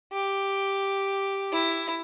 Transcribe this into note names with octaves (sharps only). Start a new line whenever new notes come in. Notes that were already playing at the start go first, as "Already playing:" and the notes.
G4
E4